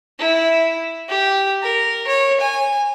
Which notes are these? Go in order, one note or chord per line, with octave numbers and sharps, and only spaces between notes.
E4
G4
A#4
C#5
G#5